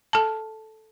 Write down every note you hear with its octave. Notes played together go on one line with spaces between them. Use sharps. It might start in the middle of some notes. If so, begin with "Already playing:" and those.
A4 A5